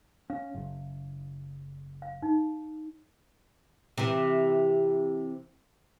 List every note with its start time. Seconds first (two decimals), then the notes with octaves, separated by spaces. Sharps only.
0.30 C#4 F5
0.54 F#1
2.02 F5
2.22 D#4
3.98 C3 E3